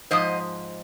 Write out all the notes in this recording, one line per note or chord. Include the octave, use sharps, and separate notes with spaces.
G#2 F3 C5 D#5